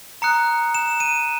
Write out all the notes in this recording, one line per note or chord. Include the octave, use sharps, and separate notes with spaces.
A#5 D#6 F#6 C#7
E7
D#7